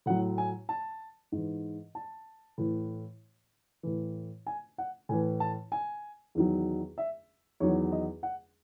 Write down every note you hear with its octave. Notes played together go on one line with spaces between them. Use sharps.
A2 F#3 F#5
G#5
A5
G#2 E3
A5
A2 E3
A2 E3
G#5
F#5
A2 E3 G#5
A5
G#5
E2 D#3 F#3
E5
E2 D#3 F#3 C#5
D#5
F#5